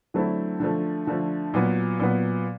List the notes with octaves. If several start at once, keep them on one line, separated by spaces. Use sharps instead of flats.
D3 F#3 A3 C4 E4
D3 F3 A3
D3 F3 A3
A#2 F#3 B3
A#2 F#3 B3